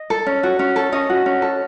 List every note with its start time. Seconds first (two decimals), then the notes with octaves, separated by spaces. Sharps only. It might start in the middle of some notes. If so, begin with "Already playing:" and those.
Already playing: D#5
0.10 A4
0.26 C#4
0.43 F#4
0.59 C#4
0.76 A4
0.92 C#4 D#5
1.10 F#4
1.26 C#4
1.42 A4